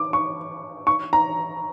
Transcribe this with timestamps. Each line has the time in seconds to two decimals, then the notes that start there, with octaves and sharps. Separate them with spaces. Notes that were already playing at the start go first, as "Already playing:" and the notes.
Already playing: D6
0.13 C#6
0.87 C#6
1.13 A#5